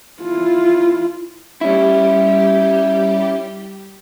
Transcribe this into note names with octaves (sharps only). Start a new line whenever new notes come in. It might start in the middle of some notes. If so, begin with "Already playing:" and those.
E4 F4
G3 C#4 E4 G4